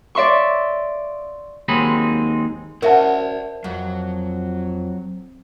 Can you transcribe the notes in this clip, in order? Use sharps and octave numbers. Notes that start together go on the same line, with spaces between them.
D5 E5 C6 C#6
D#2 F#3 G#3 C4 D#4 B5
C#4 F#4 A#4 C5 D5 E5 A5
F2 F#3